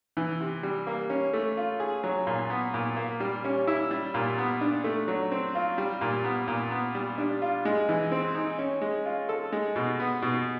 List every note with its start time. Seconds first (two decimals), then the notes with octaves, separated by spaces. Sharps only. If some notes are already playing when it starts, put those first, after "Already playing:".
0.17 E3
0.40 C3
0.63 G3
0.87 A#3
1.10 C#4
1.33 A3
1.57 F4
1.80 G#4
2.04 F#3
2.27 A#2
2.50 B3
2.74 A#2
2.97 A#3
3.20 G3
3.44 C#4
3.68 E4
3.91 G3
4.14 A#2
4.38 B3
4.61 D4
4.84 A3
5.08 F#3
5.31 C4
5.55 F4
5.78 G3
6.01 A#2
6.24 B3
6.48 A#2
6.71 B3
6.95 G3
7.18 D4
7.42 F4
7.65 G#3
7.89 E3
8.12 C4
8.35 D#4
8.59 C#4
8.81 G#3
9.06 F4
9.29 A4
9.52 G#3
9.76 B2
10.00 B3
10.22 B2